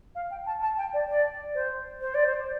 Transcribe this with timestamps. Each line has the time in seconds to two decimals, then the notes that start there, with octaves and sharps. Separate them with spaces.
0.15 F5
0.31 G5
0.46 A5
0.62 A5
0.78 G5
0.93 D5
1.09 D5
1.55 C5
2.01 C5
2.14 D5
2.27 C5